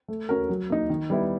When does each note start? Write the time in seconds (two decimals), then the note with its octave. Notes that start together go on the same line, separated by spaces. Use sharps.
0.08 A3
0.29 C#4 F#4 A#4
0.49 F#3
0.70 A#3 D#4
0.90 D#3
1.10 G3 B3 E4